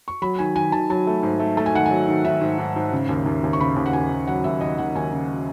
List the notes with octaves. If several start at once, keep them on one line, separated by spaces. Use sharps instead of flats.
C#6
F#3 B5
D#3 G#5
D#3 G#5
D#3 A5
F#3 A5
A3
G#2
A3
A3 A5
G#5
D#3 F#5
G#5
F#3
D#3
D#3 E5
G#2
G#2
G#2
C#3
D#2
D#2
D#2
C#6
C#3 B5
D#2
F#5
D#2 G#5
D#2
F#3 F#5
D#2 E5
D#2 D#5
D#2 F#5
D#2 G#5
C#3